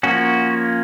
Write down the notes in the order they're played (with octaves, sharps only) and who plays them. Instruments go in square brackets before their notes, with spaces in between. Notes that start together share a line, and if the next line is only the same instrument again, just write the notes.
[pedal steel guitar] F3 A#3 C#4 F#4